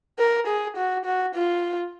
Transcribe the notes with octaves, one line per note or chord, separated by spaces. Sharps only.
A#4
G#4
F#4
F#4
F4